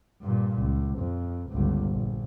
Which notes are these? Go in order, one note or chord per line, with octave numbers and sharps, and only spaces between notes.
G2 A#2
C#2
F2
G1 C#2
A#1